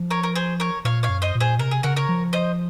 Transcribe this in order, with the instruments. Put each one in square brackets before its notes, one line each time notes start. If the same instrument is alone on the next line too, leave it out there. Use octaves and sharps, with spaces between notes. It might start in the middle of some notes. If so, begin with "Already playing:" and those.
Already playing: [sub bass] F3
[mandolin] A#4 C#5
A#4
G#4 C5
A#4 C#5
[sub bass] A#2 [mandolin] C#5 F5
[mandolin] C#5 F5
[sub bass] F#2
[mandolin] C5 D#5
[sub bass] A#2
[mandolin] G#4 C5
[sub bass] C3 [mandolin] A#4
[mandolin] G#4
[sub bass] C#3 [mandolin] F#4 A#4
[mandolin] A#4 C#5
[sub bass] F3
[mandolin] C5 D#5